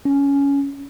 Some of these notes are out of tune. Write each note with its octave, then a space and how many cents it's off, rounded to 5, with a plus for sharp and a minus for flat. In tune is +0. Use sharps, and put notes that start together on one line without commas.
C#4 +15